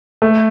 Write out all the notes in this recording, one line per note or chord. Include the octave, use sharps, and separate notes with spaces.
A3